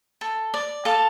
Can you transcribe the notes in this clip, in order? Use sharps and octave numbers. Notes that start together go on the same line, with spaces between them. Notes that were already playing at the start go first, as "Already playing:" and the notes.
A4
D5
A4 F5 A5